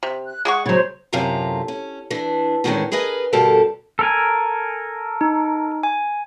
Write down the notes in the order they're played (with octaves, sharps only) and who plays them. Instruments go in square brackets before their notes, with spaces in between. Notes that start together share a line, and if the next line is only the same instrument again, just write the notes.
[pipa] C3
[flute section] F#6
[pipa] G#3 G#4 C#6 [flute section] F#5
[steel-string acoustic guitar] C#3 F#3 [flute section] C5 C#5
[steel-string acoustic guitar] F#2 A2 C3 F4 A#5
C#4
E3 D4
E2 A2 D#3 E3 G#3 C#4
G#4 A#4 B4 D#5 G#5
G2 B2 D3 G4 A4 A#4
[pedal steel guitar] A4 A#4 G#5
[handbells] D#4
G#5